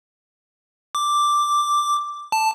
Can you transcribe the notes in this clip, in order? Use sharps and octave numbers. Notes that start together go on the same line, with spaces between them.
D6
A5